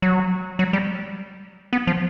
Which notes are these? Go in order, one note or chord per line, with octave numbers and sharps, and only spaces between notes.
F#3
F#3
G3
B3
F3